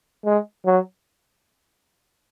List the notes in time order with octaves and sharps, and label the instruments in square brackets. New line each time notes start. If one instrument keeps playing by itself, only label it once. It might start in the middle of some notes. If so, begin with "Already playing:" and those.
[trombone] G#3
F#3